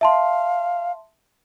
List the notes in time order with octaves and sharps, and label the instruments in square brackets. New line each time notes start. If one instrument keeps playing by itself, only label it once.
[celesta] E5 A5 C6 [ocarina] F5